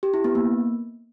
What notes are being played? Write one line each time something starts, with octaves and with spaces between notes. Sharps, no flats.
G4
E4
B3
A#3